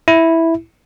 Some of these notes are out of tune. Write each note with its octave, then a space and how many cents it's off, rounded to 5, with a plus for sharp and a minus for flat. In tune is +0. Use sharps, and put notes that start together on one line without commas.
E4 -5